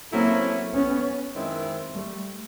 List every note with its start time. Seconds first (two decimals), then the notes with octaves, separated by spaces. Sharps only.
0.12 F#3 A3 A#3 C4 C#4 E4
0.74 B3 C#4
1.35 F#2 D#3 G#3 C4 E4
1.95 G3 A3